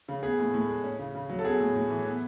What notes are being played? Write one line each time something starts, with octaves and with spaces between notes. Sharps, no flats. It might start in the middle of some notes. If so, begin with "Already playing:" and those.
C#3
B3 G#4
A2
A2
G#3
C#4
C#3
C#3
F#3
A4
B3 G#4
A2
A2
E3
B3